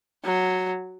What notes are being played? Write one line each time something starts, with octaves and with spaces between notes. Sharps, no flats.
F#3